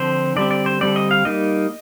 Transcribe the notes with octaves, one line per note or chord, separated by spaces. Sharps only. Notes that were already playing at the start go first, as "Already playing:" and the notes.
Already playing: D3 F3 C4 C5
D3 G3 C4 D5
D5
C5
D3 G3 C4 D5
D#5
F5
G3 A#3 D#4 D#5